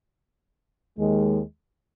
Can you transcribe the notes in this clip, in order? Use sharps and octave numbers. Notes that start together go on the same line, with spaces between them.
D#2 D#3 G#3